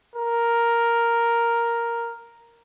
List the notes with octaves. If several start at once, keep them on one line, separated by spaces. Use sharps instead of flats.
A#4